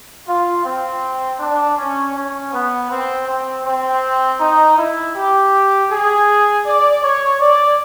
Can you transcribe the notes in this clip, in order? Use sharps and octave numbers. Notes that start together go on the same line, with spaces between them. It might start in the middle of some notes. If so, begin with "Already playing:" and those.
F4
C4
D4
C#4
C#4
B3
C4
C4
C4
D#4
E4
G4
G#4
D5
C#5
D5